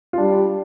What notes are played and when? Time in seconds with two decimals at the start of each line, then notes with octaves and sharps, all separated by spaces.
0.13 F4
0.18 G3 D4